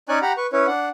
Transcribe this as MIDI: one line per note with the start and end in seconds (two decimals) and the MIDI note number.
0.09 0.19 61
0.09 0.19 63
0.09 0.19 73
0.09 0.19 74
0.09 0.19 80
0.09 0.19 90
0.22 0.32 67
0.22 0.32 78
0.22 0.32 82
0.22 0.32 83
0.37 0.47 71
0.37 0.47 85
0.53 0.67 61
0.53 0.67 64
0.53 0.67 71
0.53 0.67 73
0.67 0.89 62
0.67 0.89 78